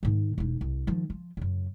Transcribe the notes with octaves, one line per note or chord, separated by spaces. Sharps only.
G#2 D#3
E1 D#4
C2
D#3 F3
F3
F#2 C#3